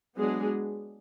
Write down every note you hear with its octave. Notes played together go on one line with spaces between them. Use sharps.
F#3 G#3 B3 D4 G#4